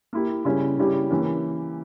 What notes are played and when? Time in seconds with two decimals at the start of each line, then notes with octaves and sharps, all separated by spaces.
0.13 A#3 E4 G4
0.45 C#3 G3 C#4 E4
0.79 C#3 G3 C#4 E4 G4
1.10 E3 A#3 C#4 G4